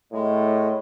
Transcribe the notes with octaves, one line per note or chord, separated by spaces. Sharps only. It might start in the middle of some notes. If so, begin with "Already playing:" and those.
A2 G#3